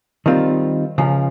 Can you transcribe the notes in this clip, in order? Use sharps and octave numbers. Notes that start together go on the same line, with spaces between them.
D#3 G3 C4 F4
C#2 C#3 F3